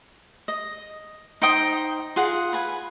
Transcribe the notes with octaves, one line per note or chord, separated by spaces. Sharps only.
D#5
D#4 C5 G5 D#6
F4 G#4 F#5
B4 G#5